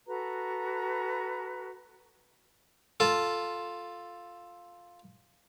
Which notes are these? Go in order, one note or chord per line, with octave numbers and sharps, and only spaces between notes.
F#4 A4 B4 A#5
F4 A4